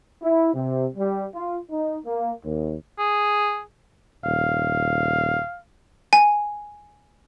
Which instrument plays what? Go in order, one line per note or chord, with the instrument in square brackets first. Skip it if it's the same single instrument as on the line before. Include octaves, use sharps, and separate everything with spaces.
[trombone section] E4
C3
G3
F4
D#4
A#3
D#2
[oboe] G#4
[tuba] D#1 [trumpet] F5
[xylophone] G#5